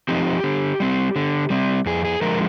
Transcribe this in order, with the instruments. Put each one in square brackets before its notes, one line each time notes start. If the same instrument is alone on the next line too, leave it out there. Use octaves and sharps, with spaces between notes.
[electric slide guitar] F3 C4 D#4 G4
D3
G3 C4
D3
G3 C4
F2 G#4
G#4
D3 F3 G#3 A#4